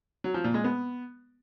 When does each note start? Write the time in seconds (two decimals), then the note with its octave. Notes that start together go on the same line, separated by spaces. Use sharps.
0.24 F#3
0.34 F3
0.44 A#2
0.54 G#3
0.64 B3